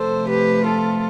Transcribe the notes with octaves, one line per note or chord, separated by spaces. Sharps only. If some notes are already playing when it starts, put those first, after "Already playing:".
Already playing: C3 F3 A3 A4 C5
G4 B4
F4 A4